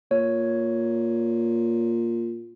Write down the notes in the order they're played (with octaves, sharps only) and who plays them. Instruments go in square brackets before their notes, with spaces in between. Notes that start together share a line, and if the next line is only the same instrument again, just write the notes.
[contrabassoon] A#2 [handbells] C#5